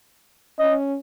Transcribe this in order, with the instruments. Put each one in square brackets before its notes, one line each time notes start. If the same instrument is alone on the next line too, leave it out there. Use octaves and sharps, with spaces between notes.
[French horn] C#4 [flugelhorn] D#5